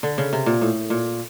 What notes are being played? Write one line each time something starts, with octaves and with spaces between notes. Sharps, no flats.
D3
C#3
C3
A#2
A2
A#2